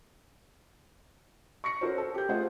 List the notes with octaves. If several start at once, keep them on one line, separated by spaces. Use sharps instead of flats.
C#6 A#6 C#7
C#4 F#4 A4 A#4 C5
A4
G4 G6
A3 F4 G#4 C5 D#5 F#5